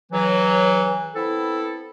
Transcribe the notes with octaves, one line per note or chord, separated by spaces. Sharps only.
C#2 E3 F#3
B3 C4 E4 A4